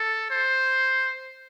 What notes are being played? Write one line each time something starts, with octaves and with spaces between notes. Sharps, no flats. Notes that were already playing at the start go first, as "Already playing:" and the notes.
Already playing: A4
C5